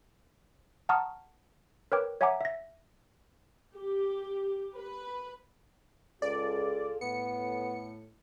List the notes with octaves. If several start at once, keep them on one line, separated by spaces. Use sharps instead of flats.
F#5 A5 A#5 C#6 D#6 F6
A#4 B4 C#5 G5 D6
C#5 E5 F#5 G#5 A#5 D6
E5 A#6
G4
B4
C#2 F4 G#4 A4 D5
A2 B3 C#7